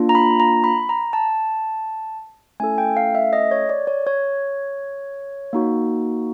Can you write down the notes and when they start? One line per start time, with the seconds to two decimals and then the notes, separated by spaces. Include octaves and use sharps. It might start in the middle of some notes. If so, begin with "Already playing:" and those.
Already playing: A#3 D4 F4
0.09 A#5
0.15 B5
0.40 A#5
0.64 B5
0.89 A#5
1.13 A5
2.60 A3 C#4 E4 A4 G#5
2.78 G5
2.97 F5
3.15 E5
3.33 D#5
3.51 C#5
3.69 D5
3.87 C#5
4.07 C#5
5.53 A#3 D#4 F#4